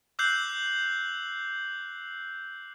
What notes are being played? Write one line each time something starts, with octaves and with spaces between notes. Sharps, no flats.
D6 E6 F#6 G6 C7 F#7